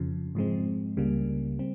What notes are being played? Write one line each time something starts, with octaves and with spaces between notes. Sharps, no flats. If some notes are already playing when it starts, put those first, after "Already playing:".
Already playing: F2 C#3 F3
G#2 F3 G#3 C4
C#2 C#3 G3 A#3
G3 C4